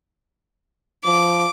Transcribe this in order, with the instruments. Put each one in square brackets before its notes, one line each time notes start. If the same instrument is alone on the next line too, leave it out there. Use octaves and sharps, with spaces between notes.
[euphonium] F3 [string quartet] D6